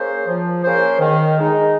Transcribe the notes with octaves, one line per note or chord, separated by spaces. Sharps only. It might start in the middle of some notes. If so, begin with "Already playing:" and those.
Already playing: A#3 C#4 G#4 C5
F3
A#3 C#4 G#4 C5
D#3
G#3 D#4